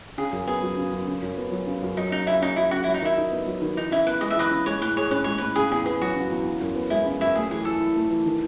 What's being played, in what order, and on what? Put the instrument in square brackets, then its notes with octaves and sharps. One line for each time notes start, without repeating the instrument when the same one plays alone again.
[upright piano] C#3 [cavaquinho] G#4
[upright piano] F#2
[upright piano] B3 [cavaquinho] G#4
[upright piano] F#3
C#3
F#2
C#3
F#2
B3
F#3
C#3
F#2
[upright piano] F#3 [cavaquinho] D#4
[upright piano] C#3 [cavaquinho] D#4
[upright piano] C#3 [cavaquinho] E4
[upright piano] C#4 [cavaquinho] D#4
[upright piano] F#3 [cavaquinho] E4
[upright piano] C#3 [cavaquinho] F#4
[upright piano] F#3 [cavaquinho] E4
[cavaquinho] D#4
[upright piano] D#3 [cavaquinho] E4
[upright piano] D#4
B3
F#3
D#3
[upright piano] E3 [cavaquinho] D#4
[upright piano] C#3 [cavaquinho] E4
[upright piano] B3 [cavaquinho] B4
[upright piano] G#3 [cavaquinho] D#5
[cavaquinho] E5
[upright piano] E3 [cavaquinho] B4 D#5
[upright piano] C#3
[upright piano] G#3 [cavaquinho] C#5
[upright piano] A2 [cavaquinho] B4
[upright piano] G#4 [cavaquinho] C#5
[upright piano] C#4 [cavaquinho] B4
[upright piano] G#3 [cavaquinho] C#5
[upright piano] A2 [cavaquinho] B4
[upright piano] C#3 [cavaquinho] G#4
[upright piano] E2 [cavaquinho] G#4
[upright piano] B3 [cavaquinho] G#4
[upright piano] F#3 [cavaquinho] F#4
[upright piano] C#3
E2
C#3
F#2
B3
[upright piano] G#3 [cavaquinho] E4
[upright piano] C#3
[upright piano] F#2 [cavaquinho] E4
[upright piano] A3 [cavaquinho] G#4
[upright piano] E3 [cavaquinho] G#4
[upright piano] E3 [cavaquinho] A4
[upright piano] E4
A3
E3
D#3